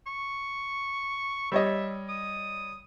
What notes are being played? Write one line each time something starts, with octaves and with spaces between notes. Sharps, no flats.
C#6
G3 C#5 D#5 E5
D#6